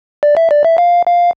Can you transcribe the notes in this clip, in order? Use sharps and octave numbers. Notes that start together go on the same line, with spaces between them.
D5
E5
D5
E5
F5
F5